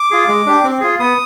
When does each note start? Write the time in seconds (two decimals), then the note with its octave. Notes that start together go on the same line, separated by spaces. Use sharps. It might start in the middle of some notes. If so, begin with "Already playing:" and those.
Already playing: D6
0.11 F4 G#4
0.28 G#3
0.46 D4 G4
0.64 C4
0.81 F4 G#4
0.99 B3 D#6